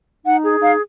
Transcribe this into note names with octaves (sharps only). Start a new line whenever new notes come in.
D#4 F#5
G#4
D#4 F5